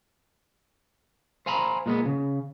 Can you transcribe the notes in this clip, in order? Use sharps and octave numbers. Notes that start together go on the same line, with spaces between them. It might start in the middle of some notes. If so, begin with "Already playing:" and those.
C5 F5 G#5 A#5 B5
A#2 G#3 B3
C#3